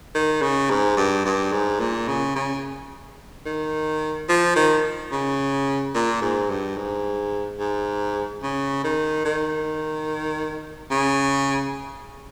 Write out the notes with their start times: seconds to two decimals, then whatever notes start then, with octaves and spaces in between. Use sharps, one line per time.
0.15 D#3
0.42 C#3
0.70 G#2
0.97 G2
1.25 G2
1.52 G#2
1.80 A#2
2.08 C#3
2.36 C#3
3.46 D#3
4.29 F3
4.56 D#3
5.12 C#3
5.94 A#2
6.22 G#2
6.49 G2
6.77 G#2
7.59 G#2
8.43 C#3
8.84 D#3
9.25 D#3
10.91 C#3